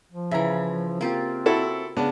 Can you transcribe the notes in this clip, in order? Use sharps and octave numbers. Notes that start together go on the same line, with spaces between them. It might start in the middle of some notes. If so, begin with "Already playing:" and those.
F3
C#3 E3 E5 A#5
A#3 C4 F4 G4
E4 F#4 A4
C#3 B3 D4